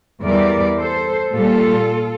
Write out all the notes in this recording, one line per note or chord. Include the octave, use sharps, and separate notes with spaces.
E2 E3 G3 A#4 D5
A4 C5
A#2 G3 F4 A4